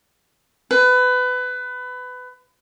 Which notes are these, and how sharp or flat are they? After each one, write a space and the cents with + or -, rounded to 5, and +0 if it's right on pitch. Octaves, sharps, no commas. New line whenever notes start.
B4 +20